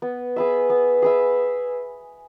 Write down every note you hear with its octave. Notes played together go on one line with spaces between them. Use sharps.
B3
G#4 B4 E5
B3
G#4 B4 E5